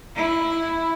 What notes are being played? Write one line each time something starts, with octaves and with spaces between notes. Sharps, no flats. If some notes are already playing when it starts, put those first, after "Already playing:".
E4